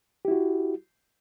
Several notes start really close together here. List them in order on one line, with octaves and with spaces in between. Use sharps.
G4 E4 F#4